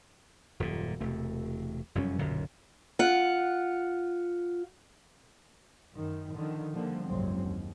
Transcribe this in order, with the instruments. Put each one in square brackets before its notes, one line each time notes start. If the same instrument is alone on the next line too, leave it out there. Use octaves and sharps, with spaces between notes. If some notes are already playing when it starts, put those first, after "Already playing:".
[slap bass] D#1 F#2 A#2
E1 C3 A3
F1 F#2 G3 C#4
D#1 B1 F#2 D3
[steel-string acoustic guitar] F4 F#5
[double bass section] F#2 D#3
D3 D#3 F3
D3 F3 G3 A#3
F#1 C2 G#2 F#3 G#3 C4
D#2